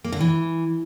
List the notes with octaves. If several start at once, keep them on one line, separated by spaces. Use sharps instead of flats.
A#3
D3
E3